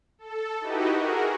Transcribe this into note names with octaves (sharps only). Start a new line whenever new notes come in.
A4
D#4 E4 F#4 G4 B4 D#5
F#4 G#4 A#4